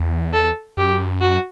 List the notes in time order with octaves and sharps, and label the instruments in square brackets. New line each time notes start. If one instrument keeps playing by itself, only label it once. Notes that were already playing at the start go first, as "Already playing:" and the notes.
Already playing: [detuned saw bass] E2
[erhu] A4
[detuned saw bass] F#2 [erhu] G4
[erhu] F#4